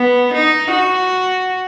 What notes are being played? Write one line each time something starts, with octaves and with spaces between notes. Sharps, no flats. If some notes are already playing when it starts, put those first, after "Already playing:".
Already playing: B3
D#4
F#4